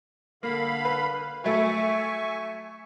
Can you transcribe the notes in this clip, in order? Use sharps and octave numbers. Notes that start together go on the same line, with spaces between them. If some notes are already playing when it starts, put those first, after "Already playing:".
D3 A#3 F5 B5
B4
F#3 A3 E5 G#5 C#6